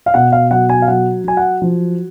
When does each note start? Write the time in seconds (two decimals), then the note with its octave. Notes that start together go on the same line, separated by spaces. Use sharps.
0.06 F5
0.14 B2 F#5
0.32 F5
0.51 F#3 F#5
0.69 G#5
0.82 F5
0.88 F#3 F#5
1.24 F#3 G#5
1.37 F#5
1.62 F3